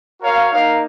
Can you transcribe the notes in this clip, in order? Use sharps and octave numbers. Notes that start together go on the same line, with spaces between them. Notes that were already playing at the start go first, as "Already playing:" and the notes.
F#4 A#4 C#5 F5
A#3 D#4 A#4 F5